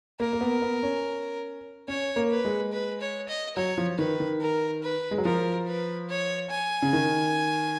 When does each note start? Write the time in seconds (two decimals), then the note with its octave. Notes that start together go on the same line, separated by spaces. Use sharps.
0.20 A#3 A#4
0.33 A#3
0.41 B3
0.62 B3
0.83 C#4
1.88 C#4 C#5
2.16 A#3
2.31 B4
2.45 G#3
2.72 B4
3.01 C#5
3.29 D#5
3.56 F#3 C#5
3.78 F3
3.98 D#3 B4
4.20 D#3
4.41 A#4
4.83 B4
5.11 G#3
5.18 F#3
5.25 F3 A#4
5.68 B4
6.09 C#5
6.51 G#5
6.82 C#3
6.93 D#3